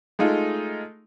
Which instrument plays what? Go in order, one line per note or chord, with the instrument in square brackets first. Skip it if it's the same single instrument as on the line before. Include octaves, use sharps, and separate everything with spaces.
[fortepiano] G#3 A3 D#4 F4